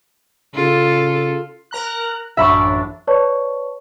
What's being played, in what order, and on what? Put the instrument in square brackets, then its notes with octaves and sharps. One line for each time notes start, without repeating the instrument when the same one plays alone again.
[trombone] C#3 [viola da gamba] F4 A4
[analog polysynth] A#4 A#5 F#6
[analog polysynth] A1 F#2 D4 [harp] E5 B5 C#6
[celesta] B4 C#5 D5 A5 C#6